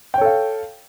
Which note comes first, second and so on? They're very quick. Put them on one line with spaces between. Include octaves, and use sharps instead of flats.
G5 C#5 A4 F5